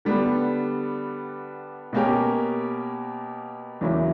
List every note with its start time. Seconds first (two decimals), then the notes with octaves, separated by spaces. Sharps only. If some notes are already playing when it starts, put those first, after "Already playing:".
0.05 D3 G3 B3 D4
1.93 B2 A#3 C#4 G4 A#4
3.81 E2 C#3 F#3 A#3 E4